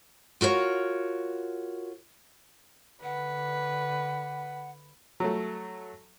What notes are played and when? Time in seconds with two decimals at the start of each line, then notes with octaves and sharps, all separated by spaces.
0.41 F4 F#4 A#4 C#5
3.03 D3 B4 F#5
5.20 F#3 A3